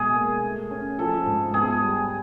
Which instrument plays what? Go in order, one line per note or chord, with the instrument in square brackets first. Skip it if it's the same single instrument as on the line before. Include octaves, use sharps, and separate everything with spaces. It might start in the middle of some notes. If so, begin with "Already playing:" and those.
Already playing: [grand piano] B2 G#3 B3 [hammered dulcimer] G#4
[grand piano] A#3
A3
C#4
[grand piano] F3 [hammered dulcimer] A4
[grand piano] G#2
[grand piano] B3 [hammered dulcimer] G#4
[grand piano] G3